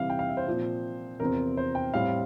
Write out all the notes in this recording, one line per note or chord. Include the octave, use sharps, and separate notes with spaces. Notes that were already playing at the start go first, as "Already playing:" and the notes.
Already playing: C3 E3 G3 E5 F5
G5
F5
E5
C5
A#2 F3 C4
E2 C3 F3 C4 A#4
C5
G5
A2 G3 C4 F5